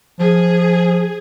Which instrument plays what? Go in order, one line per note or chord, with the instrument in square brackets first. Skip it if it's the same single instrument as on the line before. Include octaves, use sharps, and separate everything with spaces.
[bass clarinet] F3 [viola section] G#4